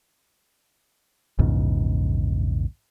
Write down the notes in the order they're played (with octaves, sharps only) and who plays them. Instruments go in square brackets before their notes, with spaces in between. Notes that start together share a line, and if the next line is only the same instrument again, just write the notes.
[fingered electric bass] A#1 E2 G#2 C#3